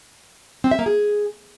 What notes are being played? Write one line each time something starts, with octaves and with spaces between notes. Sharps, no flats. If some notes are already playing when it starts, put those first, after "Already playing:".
C4
E5
A#3
G#4